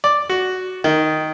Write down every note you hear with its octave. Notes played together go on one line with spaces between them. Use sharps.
D5
F#4
D#3